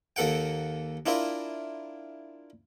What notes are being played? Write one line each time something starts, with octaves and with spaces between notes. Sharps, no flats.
D#2 A#3 A4 F#5 G5
D4 E4 F4 A#4 E5